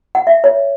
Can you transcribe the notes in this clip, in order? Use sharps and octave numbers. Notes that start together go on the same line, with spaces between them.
F#5
E5
C#5